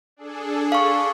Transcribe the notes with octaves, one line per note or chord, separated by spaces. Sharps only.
D4 G#4 A4
F5 C#6